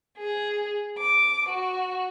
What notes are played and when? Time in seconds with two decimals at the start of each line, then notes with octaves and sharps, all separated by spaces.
0.16 G#4
0.98 D6
1.50 F#4